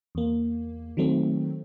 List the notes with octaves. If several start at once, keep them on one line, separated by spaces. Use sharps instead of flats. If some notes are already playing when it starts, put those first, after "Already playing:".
E2 A#3
D#3 F#3 A3 C4